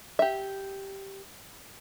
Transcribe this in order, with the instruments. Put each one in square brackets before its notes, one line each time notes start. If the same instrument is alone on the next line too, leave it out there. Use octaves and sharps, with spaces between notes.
[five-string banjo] G4 E5